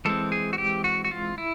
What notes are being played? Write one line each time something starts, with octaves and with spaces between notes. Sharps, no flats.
E3 G#3 C4 A4
G#4
F#4
G4
F#4
F#4
F4
E4